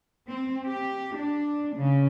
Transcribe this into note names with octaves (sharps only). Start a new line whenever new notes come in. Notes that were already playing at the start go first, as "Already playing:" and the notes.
C4
G4
D4
C#3